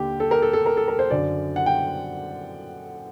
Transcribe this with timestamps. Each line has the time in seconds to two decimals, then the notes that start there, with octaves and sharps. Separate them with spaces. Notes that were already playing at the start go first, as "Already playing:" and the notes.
Already playing: D#2 D3 G4
0.20 A4
0.31 A#4
0.42 A4
0.53 A4
0.66 A#4
0.77 A4
0.88 A#4
0.99 C5
1.10 F#2 D3 D5
1.56 F#5
1.66 G5